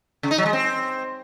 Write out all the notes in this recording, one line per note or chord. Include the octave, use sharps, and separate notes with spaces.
C#3
D#4
F#3
G#3
C4